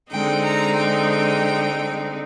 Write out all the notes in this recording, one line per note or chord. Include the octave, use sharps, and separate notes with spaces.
D3 G#3 C4 D#4 G5
A#5
G5